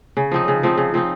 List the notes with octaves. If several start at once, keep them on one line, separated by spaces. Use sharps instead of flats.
C#3
F3 C4 D#4
C#3
F3 C4 D#4
C#3
F3 C4 D#4